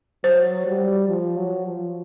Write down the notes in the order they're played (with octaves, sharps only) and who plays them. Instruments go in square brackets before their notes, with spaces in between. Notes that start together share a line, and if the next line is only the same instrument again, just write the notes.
[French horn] F#3 [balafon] C5
[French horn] G3
F3
F#3
F3